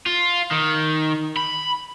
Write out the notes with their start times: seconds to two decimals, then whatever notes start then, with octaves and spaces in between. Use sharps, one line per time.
0.06 F4
0.52 D#3
1.37 B5